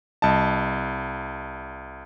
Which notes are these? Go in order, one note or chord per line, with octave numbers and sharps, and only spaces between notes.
C2 D#5 A5